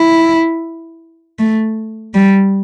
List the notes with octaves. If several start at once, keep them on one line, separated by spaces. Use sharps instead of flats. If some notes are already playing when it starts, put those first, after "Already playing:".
Already playing: E4
A3
G3